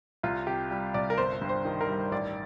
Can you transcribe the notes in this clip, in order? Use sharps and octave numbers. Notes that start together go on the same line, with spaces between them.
C2 F4
C3 G4
G3
C2 D5
A#4
G1 C5
G2
C5
D#3
A#4
G3
A1 D5